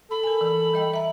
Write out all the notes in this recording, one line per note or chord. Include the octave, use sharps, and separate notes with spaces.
A4 B5
A#4 G#5
E3
G3 D#5 G5
E5 A#5